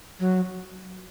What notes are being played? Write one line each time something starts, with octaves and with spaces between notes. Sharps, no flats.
F#3